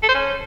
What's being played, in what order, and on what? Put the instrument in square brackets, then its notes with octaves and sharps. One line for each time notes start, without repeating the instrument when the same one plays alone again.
[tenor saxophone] A4
C5
C#4